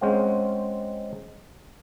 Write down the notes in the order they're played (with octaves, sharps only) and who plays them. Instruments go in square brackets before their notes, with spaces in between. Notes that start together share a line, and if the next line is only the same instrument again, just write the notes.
[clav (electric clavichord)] G#3 C4 C#4 C5 F5 F#5